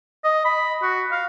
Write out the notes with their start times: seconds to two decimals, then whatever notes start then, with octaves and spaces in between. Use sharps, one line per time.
0.24 D#5
0.45 B5
0.83 F#4
1.12 F5